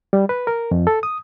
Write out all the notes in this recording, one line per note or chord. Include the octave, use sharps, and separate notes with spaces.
G3
B4
A#4
F2
A4
D#6